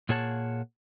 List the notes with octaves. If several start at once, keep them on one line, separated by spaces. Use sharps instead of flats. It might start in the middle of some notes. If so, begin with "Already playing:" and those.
A#2 A#3 G#4 C#5 F#5 A5